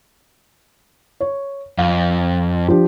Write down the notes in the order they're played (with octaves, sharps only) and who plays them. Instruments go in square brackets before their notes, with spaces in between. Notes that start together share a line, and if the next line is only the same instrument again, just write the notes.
[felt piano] C#5
[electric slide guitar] F2 [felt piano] F5
[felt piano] F3 D4 G4